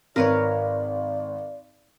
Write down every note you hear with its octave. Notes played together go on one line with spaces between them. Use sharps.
G#1 A#4 B4 C#5 D5